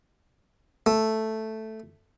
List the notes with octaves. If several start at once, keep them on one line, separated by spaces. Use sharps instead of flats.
A3